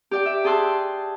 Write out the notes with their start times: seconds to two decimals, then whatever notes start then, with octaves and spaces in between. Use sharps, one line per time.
0.11 G4 D5 G5
0.26 E5
0.44 G#4 G5 A5 C6 E6 F#6